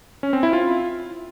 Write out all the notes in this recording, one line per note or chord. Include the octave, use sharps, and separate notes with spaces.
C#4
C4
E4
F4